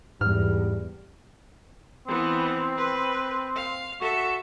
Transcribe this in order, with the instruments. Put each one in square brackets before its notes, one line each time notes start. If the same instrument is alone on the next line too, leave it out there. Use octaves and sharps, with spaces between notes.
[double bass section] E2 [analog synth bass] G#2 [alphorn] G3 [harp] F6
[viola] E3 B3 [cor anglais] C4
[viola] B4
F5
[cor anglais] F#4 [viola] A4 E5